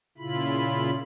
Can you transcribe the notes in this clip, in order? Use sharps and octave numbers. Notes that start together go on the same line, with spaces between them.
A#2 C#3 E4 F4 B5